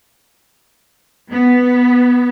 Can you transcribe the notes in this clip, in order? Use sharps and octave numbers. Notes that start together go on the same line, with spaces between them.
B3